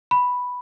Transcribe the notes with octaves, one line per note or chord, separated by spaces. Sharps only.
B5